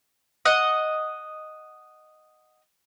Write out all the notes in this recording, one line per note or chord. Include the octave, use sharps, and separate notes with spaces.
D#5 F#5